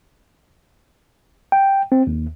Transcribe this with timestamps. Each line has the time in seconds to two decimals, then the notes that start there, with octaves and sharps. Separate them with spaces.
1.52 G5
1.92 C4
2.07 D#2